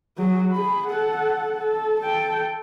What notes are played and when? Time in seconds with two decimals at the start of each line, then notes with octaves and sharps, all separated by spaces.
0.18 F#3 G#4
0.52 G#4 B5
0.87 A4 F#5
1.55 A4
2.00 A4 G5